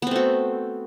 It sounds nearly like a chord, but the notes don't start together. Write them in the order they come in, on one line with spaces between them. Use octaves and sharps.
B3 C4 A3 F#4